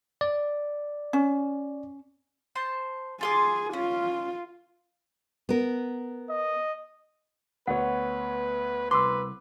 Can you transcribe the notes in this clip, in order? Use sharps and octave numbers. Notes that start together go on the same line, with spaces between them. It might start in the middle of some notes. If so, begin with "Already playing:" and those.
D5
C#4
C5 A5 C6
F4 G#4 C6 D6
C#4 F4
B3 A#4
D#5
D2 B3 B4 C#5 F#5
C2 B4 C6 D6 E6